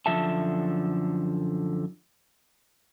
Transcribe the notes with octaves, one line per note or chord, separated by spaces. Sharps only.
F#2 D3 F3 E5 A5